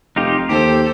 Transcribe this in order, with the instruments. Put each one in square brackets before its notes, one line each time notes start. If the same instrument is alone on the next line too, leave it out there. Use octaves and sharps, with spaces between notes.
[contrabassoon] F1 [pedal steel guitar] D#4 F4 G4
[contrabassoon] D#2 [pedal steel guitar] G4 [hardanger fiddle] A4 C5